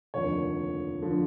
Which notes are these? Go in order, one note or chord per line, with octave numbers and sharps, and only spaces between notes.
F1 D#2 D3 F3 C#5
D3 F3